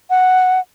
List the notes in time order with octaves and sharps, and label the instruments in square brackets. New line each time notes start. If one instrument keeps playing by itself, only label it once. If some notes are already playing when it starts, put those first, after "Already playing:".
[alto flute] F#5